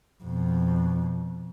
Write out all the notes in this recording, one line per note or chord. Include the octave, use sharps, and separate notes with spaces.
F2 B2